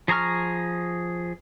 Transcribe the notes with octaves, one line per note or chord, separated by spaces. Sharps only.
F3 G#4 A#5 C#6 F6